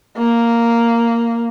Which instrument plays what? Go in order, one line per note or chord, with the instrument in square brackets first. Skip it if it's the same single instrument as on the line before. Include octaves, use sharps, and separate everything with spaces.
[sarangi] A#3